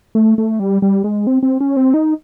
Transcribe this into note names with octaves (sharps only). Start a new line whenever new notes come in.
A3
A3
G3
G3
G#3
C4
C4
C#4
C4
D#4